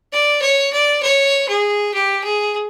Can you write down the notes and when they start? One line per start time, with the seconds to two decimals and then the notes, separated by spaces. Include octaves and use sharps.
0.12 D5
0.42 C#5
0.73 D5
1.03 C#5
1.49 G#4
1.94 G4
2.24 G#4